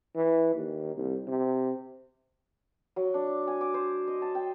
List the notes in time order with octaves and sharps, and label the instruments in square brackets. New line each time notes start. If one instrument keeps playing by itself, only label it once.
[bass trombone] E3
D#2
C2
C3
[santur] F#3
D4
G#5
D6
C5
D#5
A5
G5